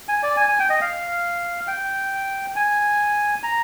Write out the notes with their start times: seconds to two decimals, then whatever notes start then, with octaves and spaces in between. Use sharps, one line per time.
0.08 G#5
0.23 D5
0.37 G#5
0.49 G#5
0.59 G5
0.70 D#5
0.81 F5
1.68 G5
2.56 G#5
3.43 A#5